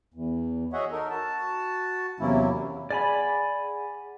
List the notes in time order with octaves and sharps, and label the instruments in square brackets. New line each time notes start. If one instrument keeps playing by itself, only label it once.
[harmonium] E2
F#4 G#4 C#5 D#5 E5 F#5
D#4 A4 A#4
F#4 A5
E2 C3 F#3 A#3 C#4 E4
[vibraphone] G#4 F#5 [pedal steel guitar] D5 G#5 B5